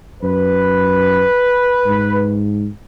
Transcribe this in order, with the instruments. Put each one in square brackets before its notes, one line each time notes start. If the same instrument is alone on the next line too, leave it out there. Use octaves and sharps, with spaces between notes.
[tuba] F#2 [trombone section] B4
[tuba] G#2